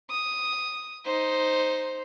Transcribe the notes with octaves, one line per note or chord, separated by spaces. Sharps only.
D#6
D#4 C5